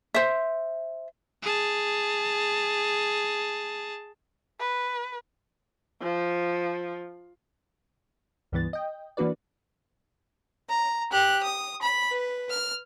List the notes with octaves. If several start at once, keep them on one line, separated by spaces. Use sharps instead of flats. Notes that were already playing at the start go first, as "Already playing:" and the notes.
C5 E5
G#4 A5
B4
F3
C#2 G2 E3 B3 A6
D#5 G5
E3 A#3 D4 F#4 B4 D5
A#5
G4 F#6
D#6
B5
B4
F6